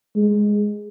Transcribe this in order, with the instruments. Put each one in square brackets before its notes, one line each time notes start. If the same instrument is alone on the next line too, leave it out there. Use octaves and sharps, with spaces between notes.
[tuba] G#3